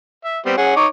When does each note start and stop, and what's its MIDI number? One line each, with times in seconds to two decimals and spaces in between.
0.24 0.39 76
0.46 0.54 55
0.46 0.54 59
0.46 0.54 60
0.57 0.74 61
0.57 0.74 68
0.57 0.74 78
0.76 0.86 63
0.76 0.86 73
0.76 0.86 86